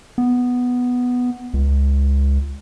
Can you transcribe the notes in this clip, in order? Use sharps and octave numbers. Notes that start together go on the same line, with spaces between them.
B3
C#2